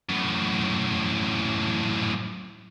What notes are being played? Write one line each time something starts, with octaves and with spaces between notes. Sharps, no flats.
F#2 A2